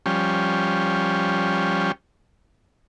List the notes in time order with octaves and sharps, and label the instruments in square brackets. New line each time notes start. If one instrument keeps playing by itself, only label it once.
[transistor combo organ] F3 G3 C#4